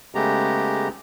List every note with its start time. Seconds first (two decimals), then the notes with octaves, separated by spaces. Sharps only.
0.15 C#3 G#3 A3 B3 G4 A#5